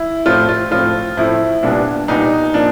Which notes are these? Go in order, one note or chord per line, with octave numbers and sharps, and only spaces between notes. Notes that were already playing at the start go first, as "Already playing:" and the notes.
Already playing: E4
A2 F3 A3 C4 F4
F4
A2 F3 A3 C4 F4
A2 F3 A3 C4 E4
C2 A#2 G3 B3 D4
C2 A#2 G3 B3 D#4
A#2 F3 A#3 D4